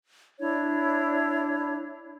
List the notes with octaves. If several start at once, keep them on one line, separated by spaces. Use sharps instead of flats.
D4 E4 C#5